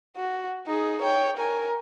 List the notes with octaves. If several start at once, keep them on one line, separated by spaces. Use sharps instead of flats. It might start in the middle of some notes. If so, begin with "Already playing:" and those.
F#4
D#4 G#4
C#5 G5
A#4 G#5